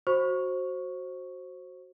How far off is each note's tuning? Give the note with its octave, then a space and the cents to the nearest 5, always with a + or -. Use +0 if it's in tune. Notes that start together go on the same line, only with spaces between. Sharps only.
F#4 +0 C5 +15 C#6 +0